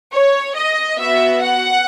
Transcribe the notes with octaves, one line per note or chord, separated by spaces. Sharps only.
C#5
D#5
B3 F#4 E5
F#5